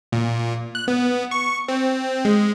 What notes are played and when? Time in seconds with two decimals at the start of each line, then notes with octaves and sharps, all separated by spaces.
0.12 A#2
0.75 F#6
0.88 B3
1.31 C#6
1.68 C4
2.25 G#3